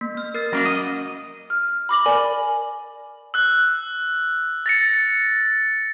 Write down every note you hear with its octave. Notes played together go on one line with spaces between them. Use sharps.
A#3
A#3 F6
A#4 F6 A6
F#3 A#3 C#4 A#6
D#5
F6
B5 D6 A#6 F#7
A#4 D5 G#5
E6 F#6
A6 A#6 C#7